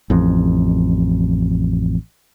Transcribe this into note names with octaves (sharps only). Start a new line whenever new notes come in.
A1 F2